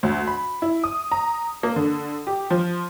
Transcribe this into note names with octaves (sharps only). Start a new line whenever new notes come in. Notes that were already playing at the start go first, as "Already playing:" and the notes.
D2
B5
E4
D#6
A#5
A#3
D3
G4
F3